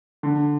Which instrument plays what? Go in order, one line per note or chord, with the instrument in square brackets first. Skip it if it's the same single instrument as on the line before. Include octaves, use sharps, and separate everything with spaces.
[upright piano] D3